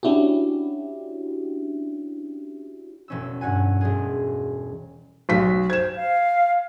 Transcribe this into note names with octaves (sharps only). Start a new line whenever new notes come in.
C#4 D4 E4 F#4 G4
E1 C#4 E6
G2 F#4 F#5 G#5
E1 G#4
B1 B6
C5 G#6 E7
F5